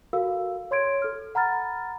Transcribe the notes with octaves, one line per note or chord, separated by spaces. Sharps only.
F#4 A4 A#4 F5 E6
C#5 C6 G#6 D7
A4 F6
F#5 A#5 B5 F6 A6